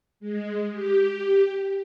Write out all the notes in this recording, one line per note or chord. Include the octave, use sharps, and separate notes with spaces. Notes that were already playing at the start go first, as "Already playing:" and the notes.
G#3
G4